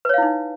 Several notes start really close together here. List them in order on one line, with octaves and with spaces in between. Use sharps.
B4 C#5 F5 E4 D#4